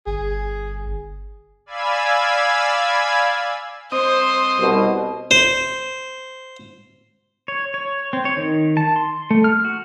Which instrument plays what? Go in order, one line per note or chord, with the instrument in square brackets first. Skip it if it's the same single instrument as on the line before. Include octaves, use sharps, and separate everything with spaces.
[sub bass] G1 [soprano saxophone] G#4
[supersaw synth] D5 F5 G#5 B5 E6 G#6
[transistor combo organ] C4 D#5 D#6 [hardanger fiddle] C5
[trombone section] C2 B2
[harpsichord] C5
[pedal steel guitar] C#5
C#5
C4
C#5
D#3
A5
C6
A3
F6
F#4